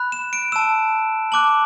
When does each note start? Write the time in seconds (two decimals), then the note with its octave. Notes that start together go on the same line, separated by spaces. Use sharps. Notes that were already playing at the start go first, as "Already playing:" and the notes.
Already playing: B5 F#6
0.12 E7
0.33 D7
0.52 A5 E6 E7
1.32 A5 D6 F#6 F#7